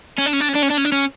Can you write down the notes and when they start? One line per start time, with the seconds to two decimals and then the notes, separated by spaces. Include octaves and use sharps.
0.18 C#4
0.26 D4
0.33 C#4
0.40 D4
0.48 C#4
0.55 D4
0.62 C#4
0.70 D4
0.77 C#4
0.85 D4
0.92 C#4